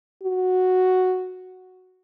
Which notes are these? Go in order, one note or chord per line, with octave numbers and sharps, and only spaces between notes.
F#4